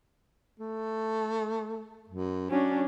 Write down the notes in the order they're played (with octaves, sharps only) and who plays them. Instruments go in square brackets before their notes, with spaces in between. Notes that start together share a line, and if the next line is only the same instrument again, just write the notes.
[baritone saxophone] A3
F#2
[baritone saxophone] F#3 [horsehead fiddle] C#4 D4